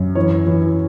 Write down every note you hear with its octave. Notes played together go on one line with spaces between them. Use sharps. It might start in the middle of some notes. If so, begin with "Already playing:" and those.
Already playing: F#2
E3 C#5
E3